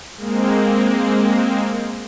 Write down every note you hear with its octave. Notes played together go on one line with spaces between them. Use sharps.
G#3 A#3 C4